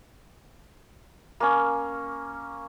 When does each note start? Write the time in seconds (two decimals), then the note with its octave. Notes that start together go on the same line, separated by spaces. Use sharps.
1.40 A#3 C#4